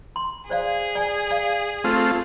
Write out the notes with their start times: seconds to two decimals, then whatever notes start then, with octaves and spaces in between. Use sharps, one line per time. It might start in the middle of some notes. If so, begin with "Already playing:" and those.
0.16 C6
0.50 G#4 C5 D5 F5
0.95 D5 G#5
1.31 D5 F5
1.84 A3 C4 F4